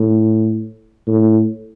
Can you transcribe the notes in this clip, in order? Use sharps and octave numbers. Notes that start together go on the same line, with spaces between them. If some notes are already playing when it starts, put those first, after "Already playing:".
Already playing: A2
A2